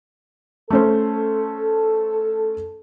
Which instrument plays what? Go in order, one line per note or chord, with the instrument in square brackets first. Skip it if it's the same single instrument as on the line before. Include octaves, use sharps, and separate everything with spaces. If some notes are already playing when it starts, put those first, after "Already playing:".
[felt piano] A3 C#4 C5 [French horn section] A4